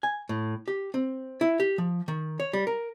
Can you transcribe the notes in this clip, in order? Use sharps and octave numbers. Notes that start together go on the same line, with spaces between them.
G#5
A2
G4
C4
E4
G4
F3
D#3
C#5
G3
A#4